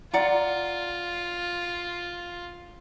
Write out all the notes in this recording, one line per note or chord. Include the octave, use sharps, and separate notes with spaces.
F4 D5 F#5 A#5